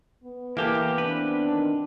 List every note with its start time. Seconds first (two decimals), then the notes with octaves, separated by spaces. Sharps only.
0.24 B3
0.57 E3 A#3 G4 A4
0.98 C4 D4 B4
1.47 D#3